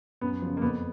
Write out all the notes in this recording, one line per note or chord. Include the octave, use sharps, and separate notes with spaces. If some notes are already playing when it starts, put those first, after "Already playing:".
F#2 B3
C#3 F3
A#3
F2 B3